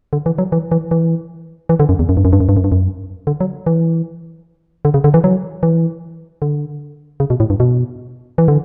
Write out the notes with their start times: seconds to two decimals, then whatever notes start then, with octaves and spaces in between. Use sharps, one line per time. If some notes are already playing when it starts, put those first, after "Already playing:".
0.13 D3
0.26 E3
0.38 F#3
0.52 E3
0.72 E3
0.91 E3
1.69 E3
1.80 D3
1.89 F#2
1.99 E2
2.09 F#2
2.17 G2
2.25 F#2
2.33 G2
2.40 F#2
2.49 G2
2.57 F#2
2.64 G2
2.72 F#2
3.27 D3
3.40 F#3
3.67 E3
4.85 D3
4.94 C#3
5.04 D3
5.14 E3
5.24 F#3
5.63 E3
6.42 D3
7.20 C#3
7.30 B2
7.40 A2
7.50 G2
7.60 B2
8.38 E3
8.48 D3